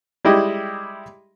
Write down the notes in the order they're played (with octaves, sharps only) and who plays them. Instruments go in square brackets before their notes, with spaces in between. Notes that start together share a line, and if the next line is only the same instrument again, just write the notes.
[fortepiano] G3 G#3 E4 G4 D#5